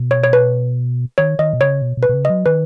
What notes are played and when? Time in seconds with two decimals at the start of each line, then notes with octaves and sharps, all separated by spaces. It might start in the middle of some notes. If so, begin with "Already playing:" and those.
Already playing: B2
0.11 C#5
0.24 C#5
0.33 B4
1.18 D#3 C#5
1.39 D#3 D#5
1.53 B2
1.61 C#3 C#5
1.82 B2
1.97 B2
2.03 B4
2.09 B2
2.14 C#3
2.25 D#5
2.30 F#3
2.46 D#3 B4